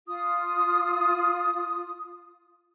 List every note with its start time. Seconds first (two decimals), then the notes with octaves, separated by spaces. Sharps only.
0.07 F4 D#6